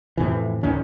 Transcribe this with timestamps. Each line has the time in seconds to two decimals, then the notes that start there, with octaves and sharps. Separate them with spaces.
0.17 F2 A2 C3 E3
0.63 A1 D2 D#3 C#4